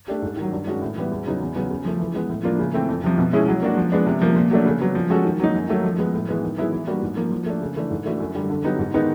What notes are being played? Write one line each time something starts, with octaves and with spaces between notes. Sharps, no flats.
A3 D4 G4
G#2
D#3 F#3
G2
D#3 G#3 C#4 F#4
A2
E3 G3 B3
E2
C#3 F#3 B3 D#4
E2
C#3 F#3 B3
C#3
F3 A3
E3
G#3 B3
A2
F3 A#3 D4 F4
C#3
E3 A3 C4
F2
C3 F3
B2
G#3 C#4 E4 G#4
F#3
A#3 D4 F#4
F3
G#3 B3 D4
C3
F3 A#3
A#2
F#3 A3 D4
C#3
F#3 B3
F3
G#3 C#4 F#4 A4
D#3
F#3 A#3 D#4
F#2
D#3 F#3 A3
F3
G#3 B3
A2
E3 G#3 B3
D#3
F#3 B3 E4 G#4
E3
G3 A#3 D4 F#4
G#2
F3 A#3
F3
A3 D4
C#3
E3 A3 D4
G#2
E3 A3 D4 F#4
F#2
D3 G3
D3
F#3 B3 D#4 G4
G#2
D#3 G#3 B3 D#4